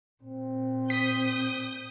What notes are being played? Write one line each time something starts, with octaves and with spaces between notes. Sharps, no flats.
A#2 C4
D#6 G6 B6